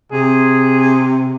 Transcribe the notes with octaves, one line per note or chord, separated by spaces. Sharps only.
C3 G#4